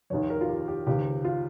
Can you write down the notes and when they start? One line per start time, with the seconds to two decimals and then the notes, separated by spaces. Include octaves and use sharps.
0.10 F1 D#2 D#3 C#5
0.30 A#4
0.41 F4
0.49 G4
0.68 G4
0.87 C#2 C3 D#3 G4
1.25 F4